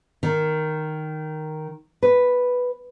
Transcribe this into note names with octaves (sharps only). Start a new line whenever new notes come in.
D#3
B4